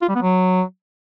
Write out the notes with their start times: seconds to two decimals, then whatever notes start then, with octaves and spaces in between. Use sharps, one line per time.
0.02 F4
0.09 G3
0.16 B3
0.22 F#3